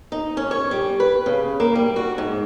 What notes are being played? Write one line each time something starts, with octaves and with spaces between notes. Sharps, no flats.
D#4
C#4
C#5
G3
B4
C#3
A#3
G3
F#4
G#2